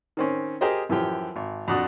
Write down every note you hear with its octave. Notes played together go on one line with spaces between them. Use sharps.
D#3 C4 C#4
G4 G#4 A#4 C5 D#5
F#2 E3 F3 G4 G5
G#1
F2 D4 F#4 D#6